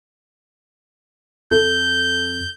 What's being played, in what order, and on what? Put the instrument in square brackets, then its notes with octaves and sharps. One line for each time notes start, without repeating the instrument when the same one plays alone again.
[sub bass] F2 [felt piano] A4 [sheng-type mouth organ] G6